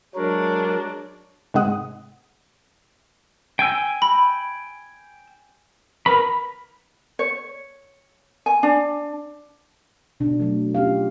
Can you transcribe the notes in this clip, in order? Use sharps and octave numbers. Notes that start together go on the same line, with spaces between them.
F#3 G#3 D4 A#4 C#5
G#2 C3 G#3 F#5 D#6
G5 G#5 E6
B5
A#4 B4 B5
C#5
G#5
D4
B2 D4
F#3 A3
C#4 F4 G4 F5